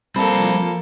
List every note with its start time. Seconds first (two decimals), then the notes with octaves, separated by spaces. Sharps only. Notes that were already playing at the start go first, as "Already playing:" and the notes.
0.16 F3 G3 A#3 C4 A4 A5 B5